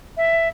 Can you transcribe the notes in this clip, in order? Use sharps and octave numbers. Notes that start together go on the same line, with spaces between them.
E5